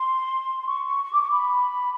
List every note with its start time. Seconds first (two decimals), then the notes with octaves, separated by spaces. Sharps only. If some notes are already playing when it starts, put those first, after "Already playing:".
Already playing: C6
0.61 C6
0.67 C#6
0.85 C#6
1.03 C#6
1.13 D6
1.22 C#6
1.31 B5